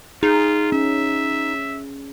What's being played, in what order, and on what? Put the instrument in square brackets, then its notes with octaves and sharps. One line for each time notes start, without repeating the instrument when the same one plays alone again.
[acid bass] D#4 [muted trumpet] F4 [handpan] G#4
[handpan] C#4 [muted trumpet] E5